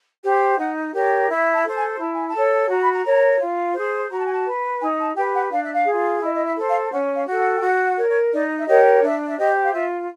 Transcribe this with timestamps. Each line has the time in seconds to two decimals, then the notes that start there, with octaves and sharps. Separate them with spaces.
0.23 G4 C5
0.58 D#4 F#5
0.93 G4 A#4 C#5
1.28 E4 E5
1.52 A5
1.63 A4 C5
1.75 G#5
1.98 E4 A5
2.12 G#5
2.25 A5
2.34 A4 C#5
2.68 F#4 A#5
2.80 B5
2.90 A#5
3.04 A#4 C#5
3.39 F4
3.74 G#4 C5
4.10 F#4 A#5
4.18 A5
4.25 G#5
4.33 A5
4.45 B4
4.80 D#4 G#5
4.98 A5
5.15 G4 B4 G5
5.33 F#5
5.50 D4 F5
5.62 E5
5.72 F5
5.86 F4 G#4
6.21 E4 D#5
6.33 D#5
6.44 E5
6.56 A4 C5
6.68 F5
6.91 C#4 F#5
7.14 F5
7.27 F#4 A4
7.38 F#5
7.56 G5
7.61 F#4 F#5
7.85 F#5
7.97 A#4 C#5
8.09 C#5
8.32 D#4 D5
8.59 E5
8.67 G4 A#4 C#5 D#5
9.02 D4 E5
9.27 E5
9.37 G4 C5 D#5
9.65 F5
9.72 F4 E5